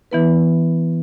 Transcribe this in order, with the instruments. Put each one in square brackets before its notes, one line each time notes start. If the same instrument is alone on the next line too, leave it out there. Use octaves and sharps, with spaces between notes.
[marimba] E3 B3 E4 B4